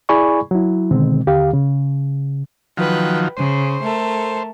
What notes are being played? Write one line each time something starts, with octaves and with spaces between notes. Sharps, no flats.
E4 G#4 D5 G#5 B5 C#6
F#3 E4
B2 D3 D#3 G#3 C4
D#2 D3 G4 F5
C#3
D#3 F3 F#3 B4 G5
C#3 C5
A3 A4 A#4